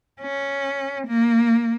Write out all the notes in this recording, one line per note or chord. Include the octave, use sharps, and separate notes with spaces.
C#4
A#3